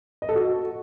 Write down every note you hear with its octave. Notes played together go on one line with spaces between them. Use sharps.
D#5
A4
F#4